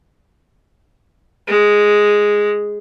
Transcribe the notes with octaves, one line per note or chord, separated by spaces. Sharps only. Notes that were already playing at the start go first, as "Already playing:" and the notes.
G#3